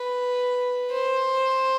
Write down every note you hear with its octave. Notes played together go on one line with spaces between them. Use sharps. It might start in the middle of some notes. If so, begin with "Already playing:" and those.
Already playing: B4
C5